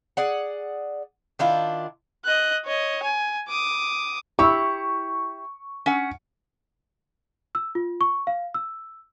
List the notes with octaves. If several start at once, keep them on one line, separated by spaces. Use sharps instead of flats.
G#4 D5 F#5
D#3 D4 E4 F4
D#5 F#6
C#5 D#5
G#5
D6 D#6
E4 G4 C#6
C#4 F#5
E6
F4
C#6
F5
E6